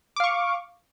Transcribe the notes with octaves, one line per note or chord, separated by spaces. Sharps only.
F5 C#6 D6